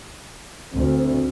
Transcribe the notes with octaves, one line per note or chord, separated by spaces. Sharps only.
D2 C4